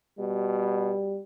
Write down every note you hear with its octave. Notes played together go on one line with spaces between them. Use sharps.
B2 G3